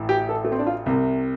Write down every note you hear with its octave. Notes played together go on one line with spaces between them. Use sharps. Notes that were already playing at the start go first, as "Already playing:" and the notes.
Already playing: A1 A2
G4
A4
A3
C4
D4
F4
C2 C3